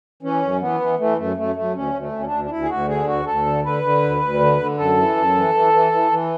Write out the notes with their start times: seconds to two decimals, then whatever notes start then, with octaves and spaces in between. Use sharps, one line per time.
0.23 E3 C#4
0.42 F#2
0.61 E3 B3
0.80 E3
0.99 E3 A3
1.18 F#2 A3
1.36 F#2 A3
1.56 F#2 A3
1.74 D2 C#4
1.93 D2
1.99 A3
2.12 D2
2.19 C#4
2.26 D4
2.31 D2
2.44 D4
2.50 D2 E4
2.63 G#4
2.69 D2 F#4
2.89 D3 G#4
3.07 D2 F#4
3.26 D2 A4
3.46 D3
3.64 D3 B4
3.83 D3
4.03 D2
4.21 D2
4.40 D3
4.59 D3
4.78 F#2 A4
4.97 E3
5.17 F#2
5.35 E3
5.54 E3
5.73 E3
5.92 E3
6.11 E3